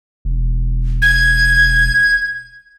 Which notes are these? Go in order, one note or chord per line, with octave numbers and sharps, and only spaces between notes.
E1
G#6